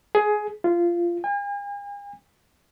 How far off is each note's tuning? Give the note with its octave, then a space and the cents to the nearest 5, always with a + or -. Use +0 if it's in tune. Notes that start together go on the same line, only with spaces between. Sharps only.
G#4 +15
F4 -15
G#5 -45